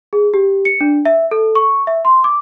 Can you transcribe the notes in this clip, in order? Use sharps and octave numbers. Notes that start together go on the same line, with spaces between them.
G#4
G4
C#7
D4
E5
A4
C#6
E5
C6
D6